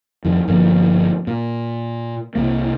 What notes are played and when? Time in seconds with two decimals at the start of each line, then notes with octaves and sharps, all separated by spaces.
0.24 F2 D#3
0.48 G1 F3 A#3 B3
1.27 A#2
2.35 C2 A#3